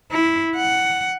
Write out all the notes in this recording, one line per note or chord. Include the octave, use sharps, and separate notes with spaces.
E4
F#5